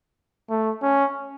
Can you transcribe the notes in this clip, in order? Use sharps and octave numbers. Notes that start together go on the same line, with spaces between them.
A3
C#4